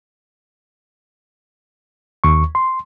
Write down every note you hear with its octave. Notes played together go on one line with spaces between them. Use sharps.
D#2 C#6
C6